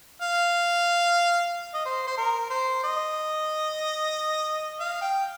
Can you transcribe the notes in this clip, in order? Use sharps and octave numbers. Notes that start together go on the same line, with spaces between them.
F5
D#5
C5
C5
A#4
C5
D#5
F5
G5